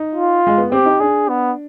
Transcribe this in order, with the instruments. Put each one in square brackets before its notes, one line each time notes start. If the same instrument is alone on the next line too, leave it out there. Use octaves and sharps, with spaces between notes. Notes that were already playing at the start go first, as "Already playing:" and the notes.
Already playing: [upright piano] D#4
[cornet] F4
[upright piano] G#3
B3
[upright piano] C4 [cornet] G4
[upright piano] D#4
[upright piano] D4 [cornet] G#4
[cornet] B3